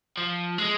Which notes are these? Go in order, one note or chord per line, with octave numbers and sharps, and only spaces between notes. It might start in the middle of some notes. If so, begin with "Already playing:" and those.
F3
G#3